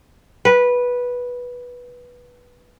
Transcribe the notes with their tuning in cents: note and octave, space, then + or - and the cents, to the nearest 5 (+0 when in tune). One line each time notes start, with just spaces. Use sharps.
B4 -10